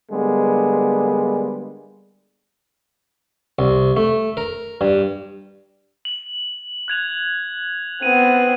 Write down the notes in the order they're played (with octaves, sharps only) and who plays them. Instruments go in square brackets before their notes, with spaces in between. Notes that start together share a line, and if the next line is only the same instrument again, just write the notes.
[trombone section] D3 G3 G#3 A#3 B3
[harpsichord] C2
A3
A#4
G2
[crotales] F#7
F#6 G#6 F7
[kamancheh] B3 C4 [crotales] D#7